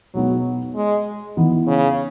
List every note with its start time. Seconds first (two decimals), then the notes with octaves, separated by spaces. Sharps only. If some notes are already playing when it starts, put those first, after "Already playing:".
0.14 B2 F#3 G#3 B3 D#4
0.75 G#3
1.37 E3 B3 D#4
1.67 C#3